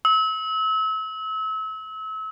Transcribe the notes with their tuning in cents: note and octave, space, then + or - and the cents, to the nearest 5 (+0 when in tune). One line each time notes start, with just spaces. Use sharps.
E6 -35